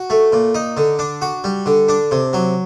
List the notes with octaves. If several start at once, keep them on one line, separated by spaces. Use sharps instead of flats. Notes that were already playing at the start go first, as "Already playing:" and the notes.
Already playing: F#4
A3
A#2
D#4
D3
D4
F#4
G3
D3
D4
C3
F#3